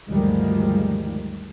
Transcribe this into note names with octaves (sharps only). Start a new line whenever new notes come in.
D2 G2 D#3 F3 G3 G#3